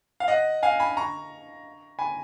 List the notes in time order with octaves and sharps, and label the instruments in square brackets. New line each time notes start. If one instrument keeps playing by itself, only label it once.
[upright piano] F5
D#5 F#5
F5 G#5
G#5 B5
A#5 C#6
G#5 B5